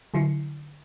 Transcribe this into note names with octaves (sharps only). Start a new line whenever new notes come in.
D3 F#3 E4 C7 C#7